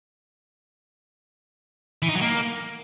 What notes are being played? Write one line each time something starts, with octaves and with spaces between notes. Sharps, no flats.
E3
D#4
F#3
A#3